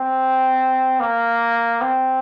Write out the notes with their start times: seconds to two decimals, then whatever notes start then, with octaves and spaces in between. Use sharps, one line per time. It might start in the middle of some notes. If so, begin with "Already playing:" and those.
Already playing: C4
1.00 A#3
1.81 C4